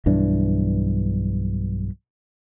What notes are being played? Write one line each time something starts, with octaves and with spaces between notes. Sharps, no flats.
B1 G2 E3 D4